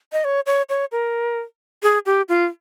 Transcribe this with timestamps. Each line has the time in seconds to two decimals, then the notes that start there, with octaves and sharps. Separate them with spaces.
0.13 D#5
0.24 C#5
0.46 C#5
0.69 C#5
0.92 A#4
1.83 G#4
2.06 G4
2.29 F4